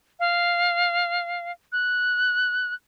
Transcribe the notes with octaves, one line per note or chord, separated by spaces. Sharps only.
F5
F#6